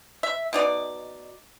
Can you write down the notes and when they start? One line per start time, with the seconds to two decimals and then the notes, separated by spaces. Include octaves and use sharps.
0.23 E5
0.53 B2 D#4 D5